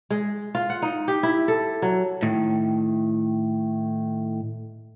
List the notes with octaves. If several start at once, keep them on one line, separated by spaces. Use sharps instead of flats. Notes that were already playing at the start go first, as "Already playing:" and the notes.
G#3
F4
F#5
D#4
G4
E4
A4
F#3
A2 D#3